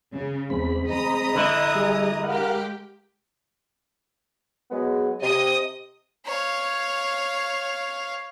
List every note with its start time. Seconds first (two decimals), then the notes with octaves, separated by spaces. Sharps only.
0.12 C#3
0.50 E2 G#3 C4 B5
0.88 D#5 A#5 D#6
1.35 D3 E4
1.75 G3 G#4
2.23 G#3 G4 A#4 F5 F#5
4.71 F#3 G#3 B3
5.22 C3 D#5 D#6
6.26 C#5 F5